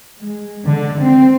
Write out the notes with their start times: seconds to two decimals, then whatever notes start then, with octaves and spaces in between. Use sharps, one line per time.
0.20 G#3
0.66 D3
1.02 C4